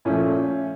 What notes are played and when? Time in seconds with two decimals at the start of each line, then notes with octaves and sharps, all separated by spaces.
0.05 A#2 F3 A3 C#4